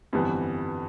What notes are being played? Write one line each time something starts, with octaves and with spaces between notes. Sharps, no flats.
G1 F2 E3 G3 B3